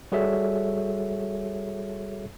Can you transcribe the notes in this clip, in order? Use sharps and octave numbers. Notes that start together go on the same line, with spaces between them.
G3 F#4 G#4 A4 C#5 E5